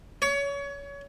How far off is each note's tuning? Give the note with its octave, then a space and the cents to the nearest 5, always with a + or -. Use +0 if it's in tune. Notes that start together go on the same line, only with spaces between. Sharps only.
C#5 +25